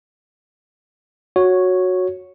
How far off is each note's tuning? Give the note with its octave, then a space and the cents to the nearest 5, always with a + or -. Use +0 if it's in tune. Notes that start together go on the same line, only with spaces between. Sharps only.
F#4 -10 C#5 +0